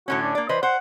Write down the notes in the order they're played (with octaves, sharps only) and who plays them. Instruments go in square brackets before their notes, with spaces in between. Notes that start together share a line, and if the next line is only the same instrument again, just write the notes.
[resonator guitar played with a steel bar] A2 D3 C#4 [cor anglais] F#4
[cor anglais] D4
[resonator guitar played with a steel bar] A#3 D5
[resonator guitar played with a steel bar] E3 B4 D#5 [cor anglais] C5
[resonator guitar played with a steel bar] C5 [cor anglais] F#5